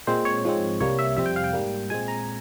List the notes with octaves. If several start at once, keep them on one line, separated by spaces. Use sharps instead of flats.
A#2 G#3 C4 C5
C#5
G#2 F3 G#3 C4
C2 C3 G3 A#3 C#5
E5
F2 C3 G3 C4 E5
G5
F5
G5
G#2 G3 A#3
A#2 G#3 C4 G#5
A#5